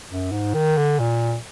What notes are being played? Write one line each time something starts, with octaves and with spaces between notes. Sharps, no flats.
F#2
G#2
D#3
D3
A#2